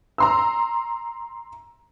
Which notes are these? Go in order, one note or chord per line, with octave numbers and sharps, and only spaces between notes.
A#5 C6 E6